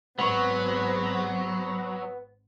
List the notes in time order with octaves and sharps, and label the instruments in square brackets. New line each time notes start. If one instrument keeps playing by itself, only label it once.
[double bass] G#1 C4 [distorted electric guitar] F#3 [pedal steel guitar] B3 C#6